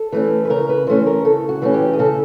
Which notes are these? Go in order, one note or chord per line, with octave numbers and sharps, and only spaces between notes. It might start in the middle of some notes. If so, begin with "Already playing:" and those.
Already playing: A4
E3 A3 C#4
B4
C#3 A#4
B4
E3 A3 C#4 C5
A#4
C#3 A4
F#4
E3 A3 C#4
G4
G#4
C#3 A4